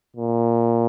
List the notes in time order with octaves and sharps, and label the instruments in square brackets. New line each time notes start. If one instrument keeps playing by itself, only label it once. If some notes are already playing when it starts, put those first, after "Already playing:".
[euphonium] A#2